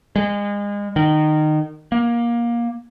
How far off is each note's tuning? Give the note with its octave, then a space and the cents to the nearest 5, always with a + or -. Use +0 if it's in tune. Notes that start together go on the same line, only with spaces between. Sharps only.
G#3 -30
D#3 -20
A#3 +20